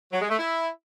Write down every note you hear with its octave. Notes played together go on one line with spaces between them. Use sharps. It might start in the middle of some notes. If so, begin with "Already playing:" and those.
F#3
G#3
A3
E4